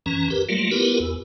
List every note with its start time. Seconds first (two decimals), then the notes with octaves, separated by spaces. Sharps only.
0.06 F#2 E3 C#4 A#5
0.30 G4 A#4 B4
0.49 F#3 G3 A3 A#3 F4
0.71 B3 E4 F4 G4 A#4 B4
1.00 E2